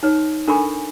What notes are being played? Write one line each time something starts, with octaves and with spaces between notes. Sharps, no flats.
D#4 B4 C#5
D4 A4 A#4 G#5 B5 C#6